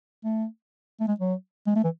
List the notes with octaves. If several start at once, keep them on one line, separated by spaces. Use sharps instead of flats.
A3
A3
G#3
F#3
G#3
A3
E3